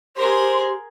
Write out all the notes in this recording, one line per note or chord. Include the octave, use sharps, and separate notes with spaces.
G4 G#4 A#4 C5 C6